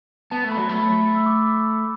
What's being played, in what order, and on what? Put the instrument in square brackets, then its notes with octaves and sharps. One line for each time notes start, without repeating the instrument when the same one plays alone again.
[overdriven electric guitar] B3 [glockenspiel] A5
[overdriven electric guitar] A3
[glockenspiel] B5
[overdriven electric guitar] F#3
[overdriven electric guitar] A3 [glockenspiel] B5
[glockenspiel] E6
D6